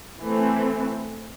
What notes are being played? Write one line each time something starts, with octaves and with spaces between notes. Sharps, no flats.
E3 A3 C4